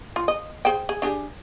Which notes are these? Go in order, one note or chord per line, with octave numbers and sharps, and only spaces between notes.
F4
D#5
G#4 C5 G5
G#4
D4 G4 G#4